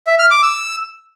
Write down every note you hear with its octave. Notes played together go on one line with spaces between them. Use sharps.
E5
F6
D6
E6